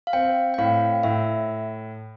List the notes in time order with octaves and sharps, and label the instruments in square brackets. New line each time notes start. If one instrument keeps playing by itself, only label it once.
[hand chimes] F5
[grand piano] C4 [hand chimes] G5
[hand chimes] G5
[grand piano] A2 [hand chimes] F5
[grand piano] A2 [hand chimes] E5